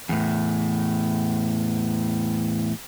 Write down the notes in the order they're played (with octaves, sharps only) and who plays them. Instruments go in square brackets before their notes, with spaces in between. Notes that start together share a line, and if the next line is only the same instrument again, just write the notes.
[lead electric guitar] E2 A2